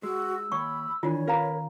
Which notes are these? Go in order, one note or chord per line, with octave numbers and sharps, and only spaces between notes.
G#3 F#4 E6
D#2 C#5 B5 C#6
D#3 E3 D4 F4 C#5
C#4 A#4 B4 F5 A#5